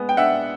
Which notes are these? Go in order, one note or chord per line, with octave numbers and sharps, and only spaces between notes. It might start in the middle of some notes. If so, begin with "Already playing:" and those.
Already playing: G#3 B3
G5
D4 E5 F#5